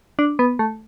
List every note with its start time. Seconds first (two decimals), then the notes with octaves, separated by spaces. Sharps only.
0.19 D4
0.39 B3
0.59 A3